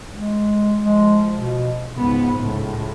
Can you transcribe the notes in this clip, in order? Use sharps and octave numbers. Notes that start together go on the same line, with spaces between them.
G#3
F3 G#3
B2
C#2 G#2 B3
C#2 A2